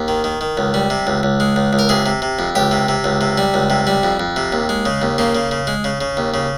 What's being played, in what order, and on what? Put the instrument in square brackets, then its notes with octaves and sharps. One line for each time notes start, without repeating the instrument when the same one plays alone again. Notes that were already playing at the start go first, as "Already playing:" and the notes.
Already playing: [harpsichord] D#2
D#3
D#3
D#3
C#2
G3
C3
C#2
C#2
G#3
C#2
C#2
A#4
C3 G#4
C3
C3
F2
C#2 G4
C3
C3
C#2
C3
G3
C#2
C3
G3
F2
F2
C3
D#2
G#3
C#3
D#2
C#3 A#3
C#3
C#3
G#3
C#3
C#3
D#2
C#3